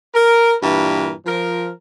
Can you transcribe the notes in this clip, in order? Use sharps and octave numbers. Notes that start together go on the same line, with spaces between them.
A#4
G2 A#2 E3 A#4
F3 A#4